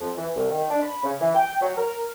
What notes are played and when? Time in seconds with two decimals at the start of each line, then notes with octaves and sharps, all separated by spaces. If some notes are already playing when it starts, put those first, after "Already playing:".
0.01 F2
0.17 E3
0.36 C2
0.51 D#3
0.70 D4
0.82 B5
1.04 C#3
1.21 E3
1.35 G5
1.61 F#3
1.78 A#4